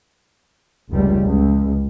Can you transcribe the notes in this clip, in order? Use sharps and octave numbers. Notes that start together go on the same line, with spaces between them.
F1 C#2 G3
C#2